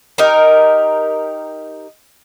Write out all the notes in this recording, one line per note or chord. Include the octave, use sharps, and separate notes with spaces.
D#4 G4 A#4